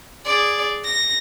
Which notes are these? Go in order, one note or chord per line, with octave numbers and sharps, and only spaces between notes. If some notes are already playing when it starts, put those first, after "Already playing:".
G#4 D5
A#6